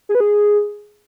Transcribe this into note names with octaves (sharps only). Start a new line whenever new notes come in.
G#4
B4
G#4